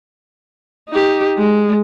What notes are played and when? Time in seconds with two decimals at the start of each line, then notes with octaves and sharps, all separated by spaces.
0.89 D#4 G4
1.37 G#3